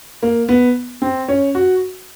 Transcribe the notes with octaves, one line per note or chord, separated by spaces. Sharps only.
A#3
B3
C4
C#4
F#4